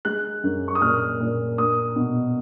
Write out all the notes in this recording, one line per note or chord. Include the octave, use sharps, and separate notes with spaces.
G#3 F#6
F#2
C#6
D#6
A#2 F6
A#2
A#3 D#6
B2